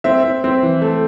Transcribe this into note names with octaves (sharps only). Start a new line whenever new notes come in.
C4 E5
C4
C4
E3
A3